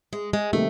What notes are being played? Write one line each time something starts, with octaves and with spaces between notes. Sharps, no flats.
G#3
G#3
C3 D#3 G3 A3 A#3